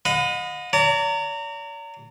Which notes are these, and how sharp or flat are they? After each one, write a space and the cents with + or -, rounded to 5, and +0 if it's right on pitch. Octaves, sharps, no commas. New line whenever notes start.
D#5 -5 F#5 -45 B5 +30
D5 -45 A#5 -30